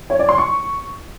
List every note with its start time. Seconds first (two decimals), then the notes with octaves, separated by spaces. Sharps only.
0.10 C#5
0.19 D5
0.29 C6
0.38 C#6